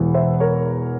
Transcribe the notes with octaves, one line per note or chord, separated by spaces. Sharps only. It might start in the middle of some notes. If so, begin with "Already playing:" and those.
Already playing: E1 E2 E3
C5 E5
A#4 C#5